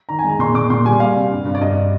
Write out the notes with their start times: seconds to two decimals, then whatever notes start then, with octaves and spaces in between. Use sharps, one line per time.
0.09 D#3 A#5
0.19 G#5
0.24 G#3 A#5
0.39 A#2 C6
0.54 A#2 D6
0.70 A#2 C6
0.85 G3 G#5
1.00 G3 F5
1.15 C3
1.31 G2
1.46 G2
1.55 D5
1.61 G2 D#5